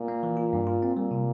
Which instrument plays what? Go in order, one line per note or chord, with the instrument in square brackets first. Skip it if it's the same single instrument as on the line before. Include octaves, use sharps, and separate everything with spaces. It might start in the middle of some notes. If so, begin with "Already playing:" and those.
Already playing: [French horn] A#2
[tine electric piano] A#3
E3
F4
G2
F4
C4
[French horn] A#2 [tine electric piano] G3
[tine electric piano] C3